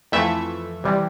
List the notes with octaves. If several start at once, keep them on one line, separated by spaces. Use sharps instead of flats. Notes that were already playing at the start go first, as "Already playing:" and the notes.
F2 E3 A3 E5
C3 E3 G3